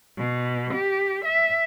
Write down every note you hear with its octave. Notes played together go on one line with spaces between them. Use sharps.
B2
G4
E5